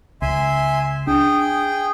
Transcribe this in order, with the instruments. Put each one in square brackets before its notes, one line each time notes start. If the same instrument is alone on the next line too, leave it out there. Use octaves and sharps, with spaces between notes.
[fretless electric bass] C#2 [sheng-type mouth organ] E5 G#5 C6
[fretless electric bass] D4 [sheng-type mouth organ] G#4 G5